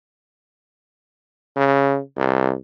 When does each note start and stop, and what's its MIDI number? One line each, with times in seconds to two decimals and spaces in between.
1.56 1.99 49
2.17 2.55 36